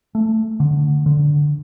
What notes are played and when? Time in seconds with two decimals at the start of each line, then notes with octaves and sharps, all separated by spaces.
0.15 A3
0.60 D3
1.06 D3